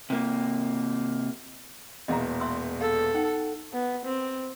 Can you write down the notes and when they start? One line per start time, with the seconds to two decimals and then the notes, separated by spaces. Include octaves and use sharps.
0.10 C3 A#3
2.08 E1 E2 A#2 D#5 F5 A#5
2.40 E5 C6 E6
2.81 A4 F5
3.14 D#4 F#5 G5
3.73 B3
4.06 C4